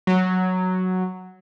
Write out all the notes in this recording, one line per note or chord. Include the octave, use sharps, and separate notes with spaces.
F#3